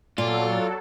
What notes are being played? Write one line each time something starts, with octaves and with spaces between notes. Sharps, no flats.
A#2 F#3 F4 A4 D5